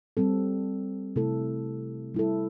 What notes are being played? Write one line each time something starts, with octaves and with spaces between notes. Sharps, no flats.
G3 C4 A4
C3 A3 E4 A4
G3 E4 A4